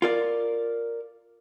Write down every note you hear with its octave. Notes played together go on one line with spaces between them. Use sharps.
F4 A#4 D5